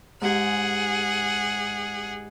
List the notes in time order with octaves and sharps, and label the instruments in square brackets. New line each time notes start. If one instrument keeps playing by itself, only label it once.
[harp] G#2 G4 G#5 [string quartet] G#4 F#5